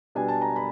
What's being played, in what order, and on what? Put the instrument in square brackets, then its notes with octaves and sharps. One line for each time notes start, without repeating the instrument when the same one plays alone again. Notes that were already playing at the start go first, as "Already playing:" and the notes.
[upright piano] B2 G3 B3 D4 G#5
A5
A#5
B5